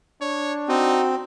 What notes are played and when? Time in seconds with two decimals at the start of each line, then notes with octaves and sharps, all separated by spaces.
0.21 D4 C#5
0.69 C4 D#4 F#4